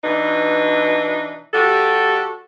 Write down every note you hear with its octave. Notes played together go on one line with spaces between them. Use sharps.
B2 E3 D4 D#4 B4
G3 F#4 G4 A4